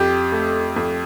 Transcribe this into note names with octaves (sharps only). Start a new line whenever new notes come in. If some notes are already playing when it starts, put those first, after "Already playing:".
Already playing: F2 G4
A3
F2